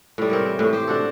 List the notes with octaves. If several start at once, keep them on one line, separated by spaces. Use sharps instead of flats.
A2 G3
C4 A#4 C#5
E3
A2
G4 C5
D4 F#4 A4